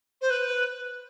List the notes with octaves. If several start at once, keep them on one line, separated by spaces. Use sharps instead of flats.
C5
B4